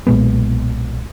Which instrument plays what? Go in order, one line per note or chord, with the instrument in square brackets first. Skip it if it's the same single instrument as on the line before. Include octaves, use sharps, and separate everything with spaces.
[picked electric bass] B1 A#2 G#3 B3